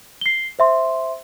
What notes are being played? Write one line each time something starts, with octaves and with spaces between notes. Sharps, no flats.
C7 G7
C5 E5 C6